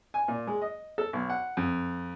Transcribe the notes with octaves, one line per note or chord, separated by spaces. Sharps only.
G#5
A#2
G#3
D#5
A4
B1
F#5
F2